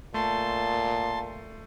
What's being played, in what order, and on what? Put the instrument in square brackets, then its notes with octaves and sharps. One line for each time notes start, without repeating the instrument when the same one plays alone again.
[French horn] A#2 [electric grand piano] A3 [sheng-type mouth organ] A5 C6